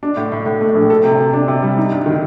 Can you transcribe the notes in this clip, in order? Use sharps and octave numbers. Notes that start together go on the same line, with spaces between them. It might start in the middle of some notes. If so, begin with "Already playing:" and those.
D4
A2
A2
A2
A3
A#1
A4
C3
C3
D4
C3
G3
D#4
G2
D#3